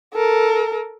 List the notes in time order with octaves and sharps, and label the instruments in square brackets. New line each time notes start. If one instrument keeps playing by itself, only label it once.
[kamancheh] A4 A#4